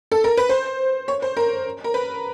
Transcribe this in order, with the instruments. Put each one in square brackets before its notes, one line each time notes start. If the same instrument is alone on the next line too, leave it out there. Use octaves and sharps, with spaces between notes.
[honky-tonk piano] A4
A#4
B4
C5
C#5
C5
A#4
A#4
B4